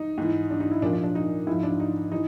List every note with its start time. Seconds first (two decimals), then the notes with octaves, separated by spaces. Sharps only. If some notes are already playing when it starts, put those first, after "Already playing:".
Already playing: D#4
0.18 G#2 E3
0.50 D4
0.60 D#4
0.71 E4
0.82 A#2 D4
0.86 F3
0.93 D4
1.04 D4
1.15 D#4
1.47 G#2 F3 E4
1.63 D4
1.80 D#4
2.12 E3 D#4